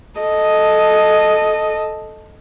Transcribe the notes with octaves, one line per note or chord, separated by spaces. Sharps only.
A4 D#5